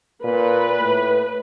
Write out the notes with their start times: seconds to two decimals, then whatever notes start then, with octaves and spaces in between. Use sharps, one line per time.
0.24 A#2 B4
0.80 A2